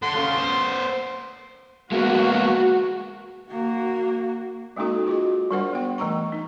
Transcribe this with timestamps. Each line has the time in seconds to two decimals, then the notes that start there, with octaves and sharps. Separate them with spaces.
0.02 A4 F#5 C6
0.16 C#4 F4
0.37 B3 C5
1.92 G#3 A#3 B3 F#4
3.50 A#3 F#4
4.76 G#3 A#3 C#4 D#4 F#4 A4
5.07 F4 F#4 G#4 D#5
5.51 G3 D4 A#4 C5 F#5 C6
5.73 B3 G5
5.98 E3 A3 G5 A#5 C#6
6.32 D#4